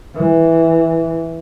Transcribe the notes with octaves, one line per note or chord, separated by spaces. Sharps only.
E3